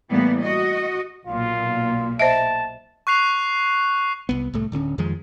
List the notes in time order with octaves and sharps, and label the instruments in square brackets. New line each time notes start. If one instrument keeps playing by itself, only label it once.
[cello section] A2 E3 G3 A#3 B3
F#4 D#5
[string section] B1 A#2 [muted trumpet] F4
[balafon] C5 D#5 E5 [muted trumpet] A5
[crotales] C#6 F#6 C7 F7
[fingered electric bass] C2 B3
C2 A2 A3
D1 D3 C4 C#4
F2 D#3 F3 G#3